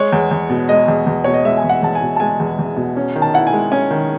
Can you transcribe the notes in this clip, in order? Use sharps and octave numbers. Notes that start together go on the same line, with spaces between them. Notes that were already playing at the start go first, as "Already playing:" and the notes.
Already playing: G#3 C#5
E2
E2
B2
G#3 D#5
E2
E2
B2 C#5
D#5
G#3 E5
G#5
E2
F#5
E2 A5
G#5
B2
A5
G#3 G#5
E2
E2
B2
C#4
D#3
A5
E4 F#5
G#5
G#3
C#4 G#5
D#3